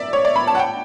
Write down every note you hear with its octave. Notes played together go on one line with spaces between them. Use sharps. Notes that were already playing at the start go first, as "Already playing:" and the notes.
Already playing: D5 E5
C#5
D5
B5
A5
F#5
G5